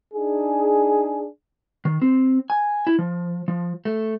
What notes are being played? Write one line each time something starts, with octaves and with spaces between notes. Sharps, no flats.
D4 D#4 G#4
D#3
C4
G#5
E4
F3
F3
A3